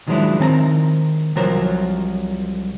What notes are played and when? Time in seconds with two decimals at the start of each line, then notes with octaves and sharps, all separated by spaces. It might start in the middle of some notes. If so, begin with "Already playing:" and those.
0.08 D#3 F3 F#3 G#3 D4 E4
0.40 D#3 C4 A5 A#5
1.36 C2 F3 F#3 A#4 C5 C#5